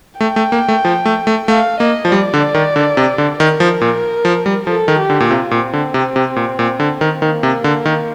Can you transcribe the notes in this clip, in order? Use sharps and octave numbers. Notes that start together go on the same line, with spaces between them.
A3 G5
A3
A#3
A3
F3
A3
A3
A3 F5
A#3 D#5
F3
G3 D5
D3
D#3
D3
C3
D3
D#3 A#4
F3
A#2
F3
G3
F3 A4
D#3
G4
D3
A#2
C3 F4
A#2
C4
D3
C3
C3
A#2
A#2
D3
D#3
D#3 A#3
C3
D3
D#3